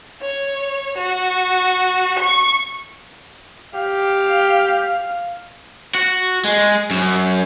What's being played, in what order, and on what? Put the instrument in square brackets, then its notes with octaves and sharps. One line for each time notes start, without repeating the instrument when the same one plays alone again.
[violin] C#5
F#4
C#6
[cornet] G4 [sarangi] F5
[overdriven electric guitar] F#4
G#3
F#2